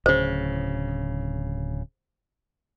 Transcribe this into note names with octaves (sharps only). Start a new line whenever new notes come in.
D1 C#3 C5